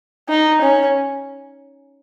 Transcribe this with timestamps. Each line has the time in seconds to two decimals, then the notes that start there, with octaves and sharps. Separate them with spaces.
0.29 D#4
0.61 C#4